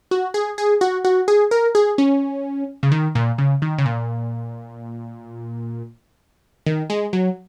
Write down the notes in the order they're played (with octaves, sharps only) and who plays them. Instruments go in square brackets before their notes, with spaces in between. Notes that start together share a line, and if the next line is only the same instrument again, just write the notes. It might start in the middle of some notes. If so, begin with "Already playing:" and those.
[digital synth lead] F#4
G#4
G#4
F#4
F#4
G#4
A#4
G#4
C#4
C#3
D#3
A#2
C#3
D#3
C#3
A#2
D#3
G#3
F#3